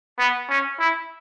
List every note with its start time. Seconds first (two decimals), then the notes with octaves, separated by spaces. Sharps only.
0.19 B3
0.50 C#4
0.79 E4